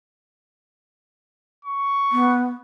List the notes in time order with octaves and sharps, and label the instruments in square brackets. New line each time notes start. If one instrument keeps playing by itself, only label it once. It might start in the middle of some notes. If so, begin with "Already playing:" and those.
[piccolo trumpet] C#6
[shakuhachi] B3